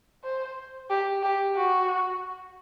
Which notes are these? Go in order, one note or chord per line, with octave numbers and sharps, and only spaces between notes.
C5
G4
G4
F#4